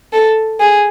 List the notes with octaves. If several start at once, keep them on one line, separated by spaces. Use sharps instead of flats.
A4
G#4